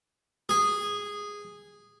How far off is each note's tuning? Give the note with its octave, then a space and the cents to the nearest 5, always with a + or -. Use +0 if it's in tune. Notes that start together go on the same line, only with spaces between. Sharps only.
G#4 -10